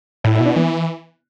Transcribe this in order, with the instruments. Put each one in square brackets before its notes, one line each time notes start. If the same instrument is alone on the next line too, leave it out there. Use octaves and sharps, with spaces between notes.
[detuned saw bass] A2 [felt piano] E4
[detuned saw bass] B2 [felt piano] E4
[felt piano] D4
[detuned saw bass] E3 [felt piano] B3